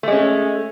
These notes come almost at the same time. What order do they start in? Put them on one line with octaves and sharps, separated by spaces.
A3 G#3 C#4